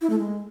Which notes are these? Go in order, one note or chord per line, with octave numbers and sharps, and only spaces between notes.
E4
A3
G#3